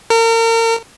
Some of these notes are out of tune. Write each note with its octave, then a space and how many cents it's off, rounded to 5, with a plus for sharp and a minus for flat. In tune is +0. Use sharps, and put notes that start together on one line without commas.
A#4 -35